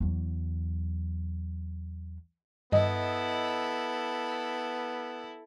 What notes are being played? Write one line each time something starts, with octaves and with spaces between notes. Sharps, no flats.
E2 F#3
G2 B3 E4 A4 D#5